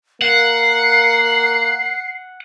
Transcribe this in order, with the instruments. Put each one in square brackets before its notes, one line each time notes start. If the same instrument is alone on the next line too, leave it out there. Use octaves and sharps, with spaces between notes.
[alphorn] A#3 [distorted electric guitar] F#5 [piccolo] C7